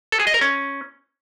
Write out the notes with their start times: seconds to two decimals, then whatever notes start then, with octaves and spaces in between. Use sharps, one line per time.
0.12 A4
0.20 G#4
0.27 D#5
0.34 A#4
0.41 C#4